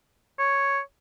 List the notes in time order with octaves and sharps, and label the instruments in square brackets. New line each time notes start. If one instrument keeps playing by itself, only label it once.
[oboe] C#5